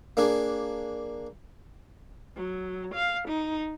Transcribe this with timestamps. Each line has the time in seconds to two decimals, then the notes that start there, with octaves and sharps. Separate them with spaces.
0.17 A#3 D4 G#4
2.37 F#3
2.94 F5
3.28 D#4